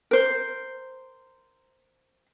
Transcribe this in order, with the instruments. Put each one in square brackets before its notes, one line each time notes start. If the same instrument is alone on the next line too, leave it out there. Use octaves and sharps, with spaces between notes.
[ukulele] A#4 C5